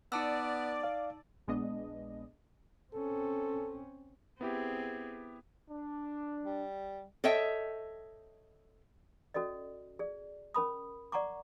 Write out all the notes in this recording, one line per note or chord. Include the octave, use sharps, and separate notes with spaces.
B3 D#4 D5 A5 E6
D5 F5
A#1 G#3 B3 D4 D#5
C4 C#4 A4
B3 C4 E4 G4 G#4
D4
G3
A4 C#5 D#5 E5 G5
C#4 F#4 A4 D5 D#5
G#4 D5
C#4 A#4 B5 D#6
D5 F#5 A#5 C#6 D6